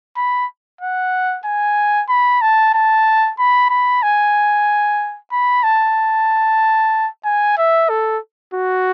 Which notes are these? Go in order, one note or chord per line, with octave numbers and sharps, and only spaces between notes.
B5
F#5
G#5
B5
A5
A5
B5
B5
G#5
B5
A5
G#5
E5
A4
F#4